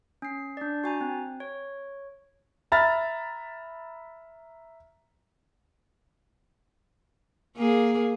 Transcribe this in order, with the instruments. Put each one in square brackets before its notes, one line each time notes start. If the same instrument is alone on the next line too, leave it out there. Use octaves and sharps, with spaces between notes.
[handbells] C#4 C7
D4 D5
F#4 G#5 A#5
C4
C#5
[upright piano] E5 A#5 B5 F6 A6
[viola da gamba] A#3 G#4